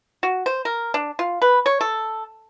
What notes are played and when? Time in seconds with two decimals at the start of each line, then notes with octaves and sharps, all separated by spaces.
0.23 F#4
0.46 C5
0.65 A#4
0.94 D4
1.19 F4
1.42 B4
1.66 C#5
1.81 A4